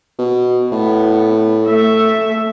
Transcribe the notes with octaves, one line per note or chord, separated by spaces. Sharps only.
B2
A2 B3
A3 E5